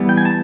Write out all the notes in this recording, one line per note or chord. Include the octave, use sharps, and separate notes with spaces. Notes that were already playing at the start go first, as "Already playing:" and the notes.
Already playing: E3 G3 B3
G5
G#5
A5